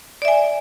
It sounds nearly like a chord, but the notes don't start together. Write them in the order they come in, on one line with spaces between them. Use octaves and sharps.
D5 E5 G#5